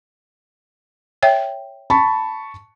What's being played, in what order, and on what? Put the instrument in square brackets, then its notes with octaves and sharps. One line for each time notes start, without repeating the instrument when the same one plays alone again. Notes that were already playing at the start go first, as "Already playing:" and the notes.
[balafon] C#5 E5 G5
[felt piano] A5 B5 C#6